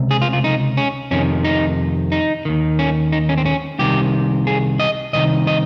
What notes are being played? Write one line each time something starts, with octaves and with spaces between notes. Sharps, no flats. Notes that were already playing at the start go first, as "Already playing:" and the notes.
Already playing: C#2 C3
G#4
F4
F4
D#4
C#4
F2 C3 D#3 C#4
D#4
D#4
D#2 D#3
C#4
D#4
C#4
C4
C#4
C2 C3 D#3 G4
G#4
D#5
C2 C3 D#3 D#5
D#5